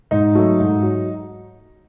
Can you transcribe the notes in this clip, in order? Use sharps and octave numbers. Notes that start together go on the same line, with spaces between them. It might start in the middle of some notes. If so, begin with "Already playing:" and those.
G#2 D#4
F#3 A3
G#2
F#3